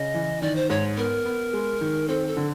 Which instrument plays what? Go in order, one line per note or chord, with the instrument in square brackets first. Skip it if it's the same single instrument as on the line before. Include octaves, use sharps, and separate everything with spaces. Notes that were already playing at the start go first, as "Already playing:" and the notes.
Already playing: [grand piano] C#3 [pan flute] D#5
[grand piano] E3
[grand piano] D#3 [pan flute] D5
[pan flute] C5
[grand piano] G#2 [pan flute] C#5
[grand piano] B3 [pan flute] A#4
[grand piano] B3
G#3
D#3
[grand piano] C4 [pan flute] A4
[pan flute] A4
[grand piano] D3